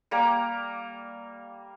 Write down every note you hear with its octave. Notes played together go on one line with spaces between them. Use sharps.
G3 A#3 A#4 A#5